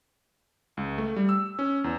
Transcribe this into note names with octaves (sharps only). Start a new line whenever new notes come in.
C#2
A3
G3
E6
C#4
E2